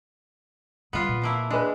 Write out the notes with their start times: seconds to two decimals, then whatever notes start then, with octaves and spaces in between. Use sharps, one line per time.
0.93 D3 G3 B3 F4
1.08 A#2
1.22 F3 A#3 E4
1.50 G#3 D4 B4